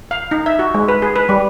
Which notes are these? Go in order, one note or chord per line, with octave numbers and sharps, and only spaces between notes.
F5
D#4
E5
F#4
G#3
B4
G#4
B4
G3